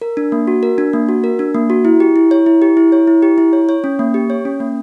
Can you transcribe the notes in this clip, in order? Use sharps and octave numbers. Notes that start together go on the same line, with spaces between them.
A#4
D4
A#3
F#4
A#4
D4
A#3
F#4
A#4
D4
A#3
F#4
E4
G4
E4
C#5
E4
G4
E4
C#5
E4
G4
E4
C#5
C#5
C#4
A#3
G4
C#5
C#4
A#3